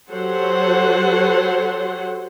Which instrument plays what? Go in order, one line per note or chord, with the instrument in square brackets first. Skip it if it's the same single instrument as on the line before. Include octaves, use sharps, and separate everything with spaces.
[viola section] F#3 G4 A4 C5 C#5 F#5